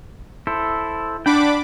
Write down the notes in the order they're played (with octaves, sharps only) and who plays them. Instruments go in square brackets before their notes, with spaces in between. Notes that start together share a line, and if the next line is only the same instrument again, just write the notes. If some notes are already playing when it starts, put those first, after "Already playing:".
[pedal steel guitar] E4 A4 C5
[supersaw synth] D4 B5 D6 [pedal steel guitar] F#5 G5